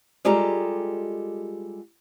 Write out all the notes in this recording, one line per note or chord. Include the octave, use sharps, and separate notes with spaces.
G3 G#3 F4 G4 A4 A#5